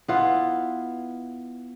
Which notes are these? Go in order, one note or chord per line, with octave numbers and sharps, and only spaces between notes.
B3 E4 F4